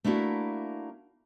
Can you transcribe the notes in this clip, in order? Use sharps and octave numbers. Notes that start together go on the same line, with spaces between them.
A3 A#3 D4 E4 F#4